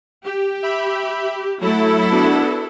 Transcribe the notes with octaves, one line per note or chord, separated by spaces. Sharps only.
G4
E5 B5
F#3 A3 E4 A4
B3 D4 F#4